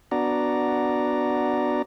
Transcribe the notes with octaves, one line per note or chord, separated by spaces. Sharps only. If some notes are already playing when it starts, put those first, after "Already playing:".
B3 D4 F#4 D5 A#5